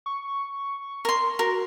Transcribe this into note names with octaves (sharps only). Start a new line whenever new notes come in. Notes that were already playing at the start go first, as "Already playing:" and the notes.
C#6
A#4 C6
F#4 A#4